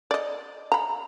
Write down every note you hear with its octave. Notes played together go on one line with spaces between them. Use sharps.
D5 D#5
A#5 B5